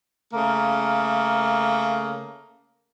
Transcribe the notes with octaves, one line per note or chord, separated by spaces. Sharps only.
C#3 A3 A#3